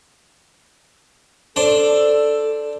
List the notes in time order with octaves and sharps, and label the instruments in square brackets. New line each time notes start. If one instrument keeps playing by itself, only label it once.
[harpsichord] D4 C5 D5 [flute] A4